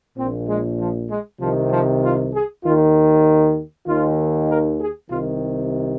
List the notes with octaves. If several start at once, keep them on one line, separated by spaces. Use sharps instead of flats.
A#1 A#2 C4
G#3
F3
G#3
C2 C3 D#3 F3
F3
F4
G#4
D#2 D#3 F4
D#2 D#3 F4
A#4
G#4
C2 C3 D#3 F4